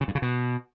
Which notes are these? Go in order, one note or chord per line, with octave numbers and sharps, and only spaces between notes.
C#3
G2
C#3
B2